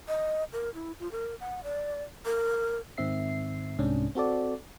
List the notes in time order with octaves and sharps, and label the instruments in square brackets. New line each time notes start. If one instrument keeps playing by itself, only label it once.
[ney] D#5
A#4
E4
F4
A#4
F#5
D5
A#4
[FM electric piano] G#2 D#3 C4 E5 C7
C2 G#2 C3 C#4 D4
C4 F#4 A4 D5